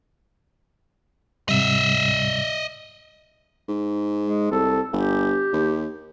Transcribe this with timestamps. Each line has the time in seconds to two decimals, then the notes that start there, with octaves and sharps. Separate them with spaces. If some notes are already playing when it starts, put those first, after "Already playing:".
1.49 G#2 C3 G3 D#5 E5
3.68 G#2
4.25 G#3
4.51 C2 A4
4.93 G1 G4
5.53 D#2